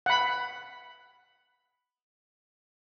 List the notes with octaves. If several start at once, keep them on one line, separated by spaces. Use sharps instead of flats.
F#5 B5